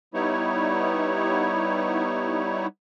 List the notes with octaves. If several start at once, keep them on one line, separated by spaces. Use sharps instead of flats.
G3 B3 D#4 E4 C#5